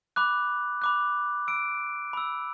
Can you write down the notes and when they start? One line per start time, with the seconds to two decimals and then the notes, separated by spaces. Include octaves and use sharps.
0.16 B5 D6 F#6
0.82 B5 D6 F#6
1.47 B5 E6 D7
2.13 B5 E6